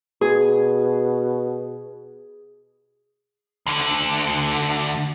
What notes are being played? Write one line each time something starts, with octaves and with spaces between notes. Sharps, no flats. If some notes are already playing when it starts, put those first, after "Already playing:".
B2 G#4
D2 D3